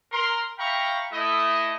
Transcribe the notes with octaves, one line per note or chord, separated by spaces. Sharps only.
A#4 C6
E5 F5 G5 A#5 B5 C#6
A3 E4 D#5